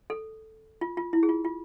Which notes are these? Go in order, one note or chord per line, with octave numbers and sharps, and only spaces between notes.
A4
F4
F4
E4
G#4
F4
F4